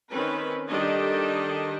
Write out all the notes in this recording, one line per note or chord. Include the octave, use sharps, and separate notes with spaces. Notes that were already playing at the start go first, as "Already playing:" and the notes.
D#3 C4 C#4 B4
D#3 G3 D4 G4 A4 D#5